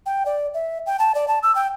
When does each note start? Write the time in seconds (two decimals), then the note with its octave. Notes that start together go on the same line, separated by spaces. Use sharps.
0.06 G5
0.26 D5
0.54 E5
0.86 G5
0.99 A5
1.15 D5
1.28 A5
1.43 E6
1.55 G5